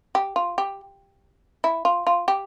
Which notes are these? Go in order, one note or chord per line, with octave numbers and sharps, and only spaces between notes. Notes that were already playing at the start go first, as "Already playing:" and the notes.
G4
F4
G4
E4
F4
F4
G4